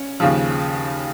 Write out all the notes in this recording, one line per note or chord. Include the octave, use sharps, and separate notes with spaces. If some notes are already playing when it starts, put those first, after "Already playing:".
Already playing: C#4
D#2 C#3 F3